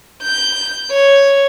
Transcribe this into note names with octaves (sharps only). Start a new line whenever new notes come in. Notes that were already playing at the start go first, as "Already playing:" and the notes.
G6
C#5